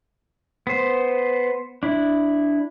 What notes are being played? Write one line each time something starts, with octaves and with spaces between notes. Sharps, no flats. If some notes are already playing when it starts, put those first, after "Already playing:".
B3 C5
D4 E4